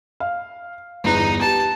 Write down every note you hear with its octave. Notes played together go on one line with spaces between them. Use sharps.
F5
G1 E2 D#4 F#6
G4 A5